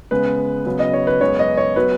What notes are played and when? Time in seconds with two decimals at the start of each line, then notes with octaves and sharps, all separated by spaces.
0.11 C#3 G#3 B3 B4
0.66 C#3 F#3 B3
0.79 D#5
0.93 C#5
1.07 B4
1.21 F#2 C#3 G#3 B3 C#5
1.39 D#5
1.57 C#5
1.76 F#3 B3 B4